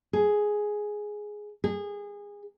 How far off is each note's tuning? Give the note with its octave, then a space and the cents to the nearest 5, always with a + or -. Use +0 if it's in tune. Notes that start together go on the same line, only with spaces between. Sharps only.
G#4 +5
G#4 -25